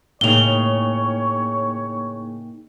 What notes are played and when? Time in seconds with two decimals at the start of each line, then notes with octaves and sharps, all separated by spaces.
0.21 A2 C#3 A#3 D#4 C#5 G5 F7 G7